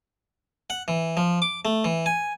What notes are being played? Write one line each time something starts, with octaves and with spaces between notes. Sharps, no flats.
F#5
E3
F3
D6
A3
E3
G#5